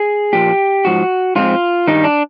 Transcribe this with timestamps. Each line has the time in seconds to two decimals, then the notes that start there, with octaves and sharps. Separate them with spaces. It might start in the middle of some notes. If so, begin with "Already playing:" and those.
Already playing: G#4
0.33 A#2 F3 A#3 G4
0.85 G#2 F3 F#4
1.36 G#2 F3 G#3 C4 F4
1.87 G2 D#3 G3 D#4
2.04 D4